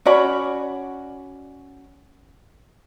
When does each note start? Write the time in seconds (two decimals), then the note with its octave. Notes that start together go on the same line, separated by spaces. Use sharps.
0.05 C#4 F#4 D5 B5